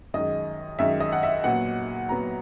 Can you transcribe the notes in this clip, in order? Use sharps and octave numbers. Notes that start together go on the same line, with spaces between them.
F#2 D#3 G#3 D#5
F#2 D#3 G#3 E5
D#5
F#5
E5
A#2 F#3 B3 F#5
A#2 F#3 B3 A#5